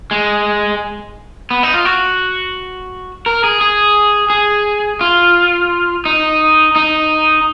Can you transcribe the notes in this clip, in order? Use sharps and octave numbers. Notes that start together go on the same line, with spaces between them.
G#3
B3
D#4
F4
F#4
A#4
G#4
G#4
G#4
F4
D#4
D#4